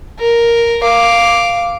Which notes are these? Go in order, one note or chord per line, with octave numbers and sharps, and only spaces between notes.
A#4
F5 D6